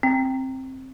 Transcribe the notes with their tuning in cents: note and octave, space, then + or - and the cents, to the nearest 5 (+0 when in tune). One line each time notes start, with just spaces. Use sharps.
C4 +10 G5 +0